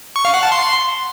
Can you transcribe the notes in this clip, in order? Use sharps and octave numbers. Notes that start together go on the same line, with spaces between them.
C#6
F5
F#5
A5
C6